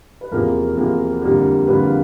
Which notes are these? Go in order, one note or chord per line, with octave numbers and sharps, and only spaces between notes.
B4
E2 C3 F3 A#3 A#4
E2 C3 F3 A#3
F2 D3 G3 A#3
F2 D3 G3 A#3 B4
F5